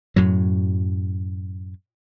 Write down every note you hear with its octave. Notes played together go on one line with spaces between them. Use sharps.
F#2 A2 F#3